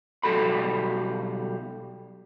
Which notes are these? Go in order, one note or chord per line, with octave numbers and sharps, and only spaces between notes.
B1 G3 F#4 A4 B5